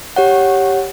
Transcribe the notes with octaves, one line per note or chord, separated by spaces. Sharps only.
G4 C#5 F#5